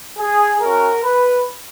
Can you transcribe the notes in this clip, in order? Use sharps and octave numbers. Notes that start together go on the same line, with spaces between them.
G#4
G#3 C#4 F#4 A#4
B4